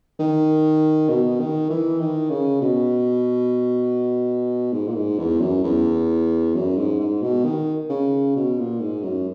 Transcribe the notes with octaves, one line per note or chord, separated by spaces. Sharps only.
D#3
B2
D#3
E3
D#3
C#3
B2
G#2
A#2
G#2
E2
F#2
E2
F#2
G#2
G#2
B2
D#3
C#3
B2
A#2
G#2
F#2